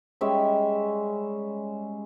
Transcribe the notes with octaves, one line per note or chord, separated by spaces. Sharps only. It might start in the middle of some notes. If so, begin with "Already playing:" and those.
G3 G#3 C#4 E5